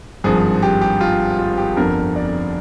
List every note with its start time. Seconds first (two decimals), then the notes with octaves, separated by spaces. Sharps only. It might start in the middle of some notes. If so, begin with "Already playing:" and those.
0.24 G#1 G2 F3 G#4
0.62 G4
0.81 G4
1.01 F4
1.39 F4
1.58 G4
1.77 G1 F2 D3 A#4
2.16 D5